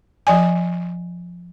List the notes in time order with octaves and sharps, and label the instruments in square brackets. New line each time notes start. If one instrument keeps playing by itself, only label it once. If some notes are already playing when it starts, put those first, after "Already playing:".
[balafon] F3 D5 G#5